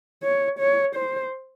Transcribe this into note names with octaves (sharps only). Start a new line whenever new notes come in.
C#5
C#5
C5